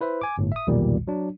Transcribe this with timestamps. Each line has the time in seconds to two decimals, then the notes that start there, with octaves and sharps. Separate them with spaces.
0.01 E4 B4 C5 E5
0.21 G#5 D6
0.38 G1 A2
0.52 E5 D#6
0.67 B1 E2 A#2 D#3 G3
1.07 F#3 D4